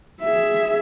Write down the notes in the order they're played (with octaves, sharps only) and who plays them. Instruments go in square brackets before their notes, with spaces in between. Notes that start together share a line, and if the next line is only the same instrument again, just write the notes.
[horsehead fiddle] G#4 E5